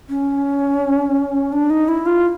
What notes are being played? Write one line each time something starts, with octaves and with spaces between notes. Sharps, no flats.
C#4
D4
D#4
E4
F4